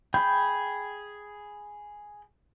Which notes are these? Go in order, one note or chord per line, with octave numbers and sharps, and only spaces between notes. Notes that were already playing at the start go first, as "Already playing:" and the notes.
G#4 G5 B5 G6